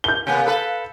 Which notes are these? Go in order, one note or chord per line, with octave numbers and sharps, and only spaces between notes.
G6 G7
C3 A#3 B3 G#5
A4 B4 F5